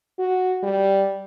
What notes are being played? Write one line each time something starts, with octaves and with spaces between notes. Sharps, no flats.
F#4
G3